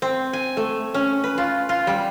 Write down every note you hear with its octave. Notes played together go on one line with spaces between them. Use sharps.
C4
G#5
A3
C#4
B4
F4
F4
G3